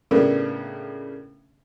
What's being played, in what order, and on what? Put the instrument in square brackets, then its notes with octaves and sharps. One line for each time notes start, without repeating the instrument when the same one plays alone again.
[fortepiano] A2 C#3 A#3 B3 D4